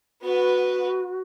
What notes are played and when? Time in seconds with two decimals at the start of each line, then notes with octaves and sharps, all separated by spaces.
0.22 B3 F#4 B4